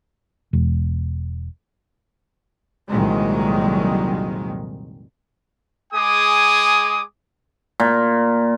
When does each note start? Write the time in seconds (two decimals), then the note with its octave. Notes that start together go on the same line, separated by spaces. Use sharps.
0.53 E1
2.89 C2 F2 A#2 D#3 F#3 G#3
5.93 G#3 G#4 G#5 D6 D#6
7.80 A#2